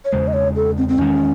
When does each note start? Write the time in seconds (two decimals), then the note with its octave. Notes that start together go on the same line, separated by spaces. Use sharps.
0.05 C#5
0.12 E2 C#3 G#3 C5
0.28 D#5
0.34 C#5
0.56 A4
0.77 C4
0.89 C4
0.98 E2 D#3 G#3 C#4